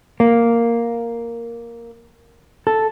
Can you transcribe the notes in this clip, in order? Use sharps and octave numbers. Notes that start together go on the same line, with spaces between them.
A#3
A4